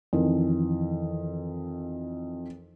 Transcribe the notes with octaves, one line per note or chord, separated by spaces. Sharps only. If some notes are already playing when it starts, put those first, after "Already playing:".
F2 D#3 E3